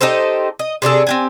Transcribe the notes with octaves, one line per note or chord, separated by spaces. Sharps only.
D#4 G4 A4 C5
D#5
C3 D4 G#4 A4
C4 G4 G#5